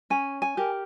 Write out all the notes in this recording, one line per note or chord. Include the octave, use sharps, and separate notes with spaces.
C#4 G#5
G#5
G4 A#4